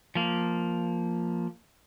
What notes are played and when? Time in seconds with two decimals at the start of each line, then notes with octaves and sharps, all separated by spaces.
0.15 F3 A#3